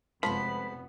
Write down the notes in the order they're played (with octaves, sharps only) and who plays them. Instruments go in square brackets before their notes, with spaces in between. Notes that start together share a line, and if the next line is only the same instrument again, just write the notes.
[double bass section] F1 B2 B3 [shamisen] F3 [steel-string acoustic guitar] G#3 A4 C5 [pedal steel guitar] B5